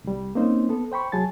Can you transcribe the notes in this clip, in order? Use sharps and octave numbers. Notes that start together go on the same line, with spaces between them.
C2 G3
A#3 C4 C#4 D#4 C5
B3 A4
C5 G5 B5 C#6
C2 F#3 G#4 G#5 A5 A6